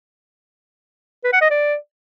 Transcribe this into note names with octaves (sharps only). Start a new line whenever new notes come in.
B4
F#5
D#5
D5